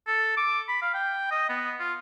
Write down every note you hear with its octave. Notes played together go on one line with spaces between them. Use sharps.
A4
D6
B5
F5
G5
D#5
B3
F4